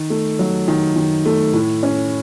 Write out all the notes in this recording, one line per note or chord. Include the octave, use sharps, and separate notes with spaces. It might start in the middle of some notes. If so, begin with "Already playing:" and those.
Already playing: D#3
A3
F#3
D#3
D#3
A3
A2
C#4